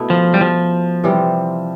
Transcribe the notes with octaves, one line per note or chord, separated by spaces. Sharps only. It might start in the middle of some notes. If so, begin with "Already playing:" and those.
Already playing: B2 A3 E4
F3
G3
F3
C3 E3 G3 C4